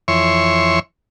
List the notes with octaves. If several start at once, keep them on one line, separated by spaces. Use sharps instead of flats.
F2 E3 C#5 E5 C6 C#6